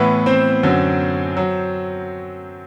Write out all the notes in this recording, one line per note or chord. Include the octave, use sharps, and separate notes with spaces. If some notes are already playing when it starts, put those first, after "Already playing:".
Already playing: A2 E3 B3 B4
C4 C5
F#2 D3 F#3
F#3